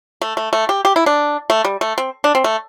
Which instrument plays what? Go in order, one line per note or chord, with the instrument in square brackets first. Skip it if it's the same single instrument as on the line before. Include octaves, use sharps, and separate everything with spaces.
[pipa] A3
A3
A3
G4
G4
E4
D4
A3
G3
A3
C4
D4
C4
A3